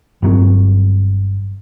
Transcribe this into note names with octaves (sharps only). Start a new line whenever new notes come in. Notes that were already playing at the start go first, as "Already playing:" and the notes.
G1 G2 F#3 C4